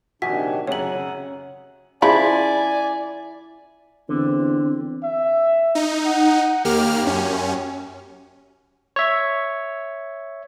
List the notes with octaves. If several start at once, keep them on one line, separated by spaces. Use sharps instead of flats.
A#1 C3 D#3 D4 F#4 G#5 B6
F#2 C#3 C#5 F#5 G#5 F#7
C#3 F3 E4 D5 G#5 B5
E2 D3 C4
E5
D#4
F#5
D#2 A#3 G4 F6
F#2 C#4
C#5 E5